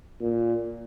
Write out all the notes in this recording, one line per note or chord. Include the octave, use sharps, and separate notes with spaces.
A#2